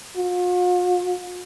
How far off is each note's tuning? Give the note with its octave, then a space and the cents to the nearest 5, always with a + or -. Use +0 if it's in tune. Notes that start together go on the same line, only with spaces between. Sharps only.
F4 +45